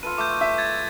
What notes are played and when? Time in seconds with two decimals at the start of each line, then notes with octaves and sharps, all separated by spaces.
0.03 F4 A4 B4 D#7
0.18 A3 D6 G6
0.41 E5
0.58 G#6 A6